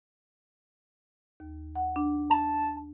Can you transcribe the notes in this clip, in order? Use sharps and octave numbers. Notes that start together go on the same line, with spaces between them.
D#2
F#5
D4
A5